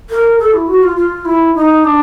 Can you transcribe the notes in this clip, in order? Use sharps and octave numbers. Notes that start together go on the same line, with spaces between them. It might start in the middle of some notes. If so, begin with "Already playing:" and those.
A#4
A4
E4
F#4
F4
F4
E4
D#4
D4